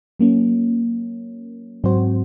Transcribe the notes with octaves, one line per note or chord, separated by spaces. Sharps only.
F#3 A#3 C#4
G#2 F#3 C4 F#4 C5